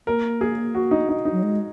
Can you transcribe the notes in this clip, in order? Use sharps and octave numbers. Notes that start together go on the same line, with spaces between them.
A#3 A#4
G#4
F#4
D#4
D#4
D#4
F#3
G#3